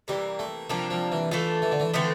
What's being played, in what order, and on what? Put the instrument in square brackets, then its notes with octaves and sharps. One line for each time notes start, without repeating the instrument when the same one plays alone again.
[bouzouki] C3 E3 A#3 [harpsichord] G3
[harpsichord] A3
[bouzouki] C3 G3 A#3 D4 [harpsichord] F3
[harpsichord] F3
E3
[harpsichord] E3 [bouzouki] A3 D4 F4
[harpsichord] E3
D3
E3
[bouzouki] D3 F3 A3 C4 [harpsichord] E3